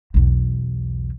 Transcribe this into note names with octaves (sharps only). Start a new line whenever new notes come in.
B1 E2